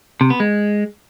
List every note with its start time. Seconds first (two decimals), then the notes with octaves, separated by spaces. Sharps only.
0.21 C3
0.30 B3
0.40 G#3